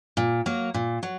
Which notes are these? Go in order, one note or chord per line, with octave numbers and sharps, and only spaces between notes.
A#2
F#3 A#3
A#2
F#3